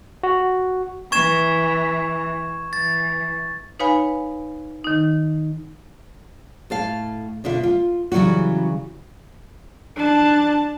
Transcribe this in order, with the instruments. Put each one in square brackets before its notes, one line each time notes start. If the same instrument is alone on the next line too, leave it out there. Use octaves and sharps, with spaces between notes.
[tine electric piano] F#4
[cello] E3 [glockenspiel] C#6 G#6 E7
[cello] E3 [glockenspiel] A6
[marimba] D#4 B4 C#5 F5 G#5 B5
D#3 D#4
[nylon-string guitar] A2 A4 F5
B2 D3 F4 E5
F4
C#3 E3 F#3 G3 C#4 F#4
[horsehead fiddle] D4 A5